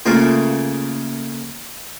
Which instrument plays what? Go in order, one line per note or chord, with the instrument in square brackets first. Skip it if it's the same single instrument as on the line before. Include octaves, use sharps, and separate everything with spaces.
[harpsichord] C#3 A3 A#3 F4